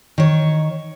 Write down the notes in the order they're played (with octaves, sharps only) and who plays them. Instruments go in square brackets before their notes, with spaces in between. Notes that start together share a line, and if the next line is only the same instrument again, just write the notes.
[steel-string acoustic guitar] D#3 C#5